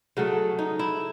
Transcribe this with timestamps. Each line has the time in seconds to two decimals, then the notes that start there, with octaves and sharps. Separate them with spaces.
0.17 C#3 F#3 A3
0.59 D#4
0.79 E4